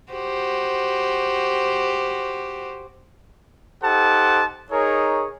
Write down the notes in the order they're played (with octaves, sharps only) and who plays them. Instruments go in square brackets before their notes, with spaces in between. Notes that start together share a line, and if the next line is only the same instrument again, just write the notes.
[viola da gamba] F#4 G4 C5
[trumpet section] D#4 G4 A4 C5 F#5 A5
D#4 G#4 A#4 C#5